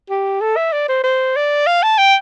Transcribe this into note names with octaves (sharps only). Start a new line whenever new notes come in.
G4
A4
E5
D5
C5
C5
D5
F5
A5
G5